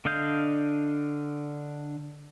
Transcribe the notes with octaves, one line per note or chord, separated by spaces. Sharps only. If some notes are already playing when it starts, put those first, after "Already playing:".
D3 D4 D#5 F5 G6